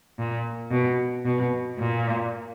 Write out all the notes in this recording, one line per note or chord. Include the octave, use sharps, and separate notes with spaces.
A#2
B2
B2
A#2